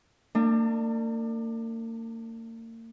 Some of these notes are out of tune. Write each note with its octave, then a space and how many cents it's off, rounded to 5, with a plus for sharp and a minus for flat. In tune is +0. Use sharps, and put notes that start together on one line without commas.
A#3 -40 D4 +25